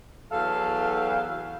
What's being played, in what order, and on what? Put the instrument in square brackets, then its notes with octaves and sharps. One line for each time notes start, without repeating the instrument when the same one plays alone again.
[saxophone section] E2 F#3 F5 [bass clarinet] A4